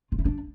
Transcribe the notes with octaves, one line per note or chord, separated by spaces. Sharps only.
F4
E4
D4